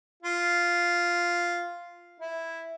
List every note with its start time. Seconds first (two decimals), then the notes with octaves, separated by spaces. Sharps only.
0.23 F4
2.20 E4